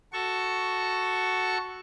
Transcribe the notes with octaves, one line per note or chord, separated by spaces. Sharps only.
F#4 A4 C#6